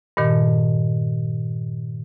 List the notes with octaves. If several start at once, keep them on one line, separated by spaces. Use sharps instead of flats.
G2 A#2 D#3